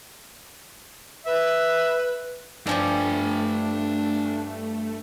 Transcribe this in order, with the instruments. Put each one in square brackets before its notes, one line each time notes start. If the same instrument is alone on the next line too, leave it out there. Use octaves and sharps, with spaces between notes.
[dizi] B4 [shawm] E5
[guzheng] G2 F3 G3 [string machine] A3 [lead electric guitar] D4 G#5